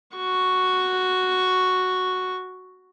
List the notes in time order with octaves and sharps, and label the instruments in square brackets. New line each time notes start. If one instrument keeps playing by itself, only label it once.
[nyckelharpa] F#4 C#6